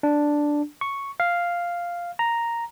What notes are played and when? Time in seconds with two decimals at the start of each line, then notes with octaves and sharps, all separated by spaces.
0.03 D4
0.81 C#6
1.20 F5
2.19 A#5